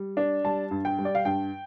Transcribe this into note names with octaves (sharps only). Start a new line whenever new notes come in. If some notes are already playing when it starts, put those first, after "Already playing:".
Already playing: G3
D4
G3 A5
G2
G5
G3
D5
F5
G2 G5